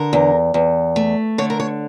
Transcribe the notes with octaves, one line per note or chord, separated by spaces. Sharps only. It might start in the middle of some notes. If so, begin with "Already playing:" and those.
Already playing: D3 A#4
E2
E2
A3
D3 C#5
A#4
C#5